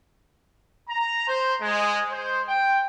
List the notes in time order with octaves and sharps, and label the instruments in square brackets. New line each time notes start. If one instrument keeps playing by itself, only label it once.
[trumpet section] A#5
C5
G#3
C5
G5